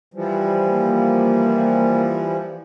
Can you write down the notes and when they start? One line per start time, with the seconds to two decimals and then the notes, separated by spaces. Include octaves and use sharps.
0.14 E3 F3 G3
0.69 A#3